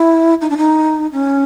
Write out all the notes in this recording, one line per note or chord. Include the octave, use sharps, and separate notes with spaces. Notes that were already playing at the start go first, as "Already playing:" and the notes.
Already playing: E4
D#4
D4
D#4
C#4